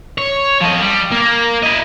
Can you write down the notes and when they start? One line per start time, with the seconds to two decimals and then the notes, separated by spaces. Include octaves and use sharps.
0.18 C#5
0.61 F3 D#5
0.81 G3
1.11 A#3
1.63 E4 D#5